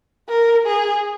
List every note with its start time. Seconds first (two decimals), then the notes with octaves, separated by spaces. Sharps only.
0.29 A#4
0.67 G#4